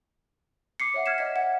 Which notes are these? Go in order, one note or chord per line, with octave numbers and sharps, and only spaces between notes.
D6 C7 C#7
C#5 E5 F#5
F6 G#6 B6 C#7 E7
D#5 E5 G#6 B6
F#5